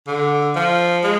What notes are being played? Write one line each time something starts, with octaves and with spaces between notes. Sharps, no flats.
D3
F3
G#3